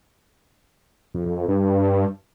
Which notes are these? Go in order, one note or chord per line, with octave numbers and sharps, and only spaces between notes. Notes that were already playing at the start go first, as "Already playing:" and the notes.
F2
F2
F2
G2